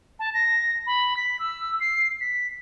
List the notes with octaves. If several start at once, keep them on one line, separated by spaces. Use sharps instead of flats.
A5
A#6
B5
B6
E6
C7
B6